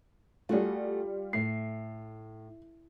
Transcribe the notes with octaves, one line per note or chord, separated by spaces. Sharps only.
G3 A3 F4 F#4 G#4
A2 C7